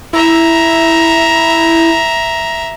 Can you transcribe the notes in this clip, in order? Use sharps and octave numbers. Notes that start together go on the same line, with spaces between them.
E4 E5 A#5